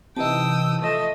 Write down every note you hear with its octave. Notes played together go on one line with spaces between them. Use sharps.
C3 E3 D#4 G5 A5 D#6 E6
F3 A3 D#5